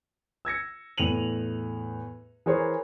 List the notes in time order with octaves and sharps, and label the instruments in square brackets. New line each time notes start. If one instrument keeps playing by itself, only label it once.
[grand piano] E6 G#6 A#6 C#7
E2 A2 D#7 F7 F#7
E3 G#4 A#4 C5 C#5